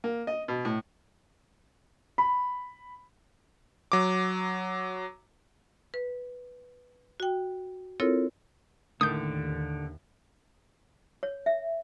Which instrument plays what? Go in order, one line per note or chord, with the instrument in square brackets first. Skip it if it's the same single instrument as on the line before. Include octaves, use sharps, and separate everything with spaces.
[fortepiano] A#3
D#5
B2
A2
[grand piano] B5
[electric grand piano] F#3 D6
[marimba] B4
F#4 G5
C4 E4 F4 A4 A#4 C#5
[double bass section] D#2 [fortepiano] A2 D#3 [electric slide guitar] D3 [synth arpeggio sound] D#6 G6
[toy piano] C#5
E5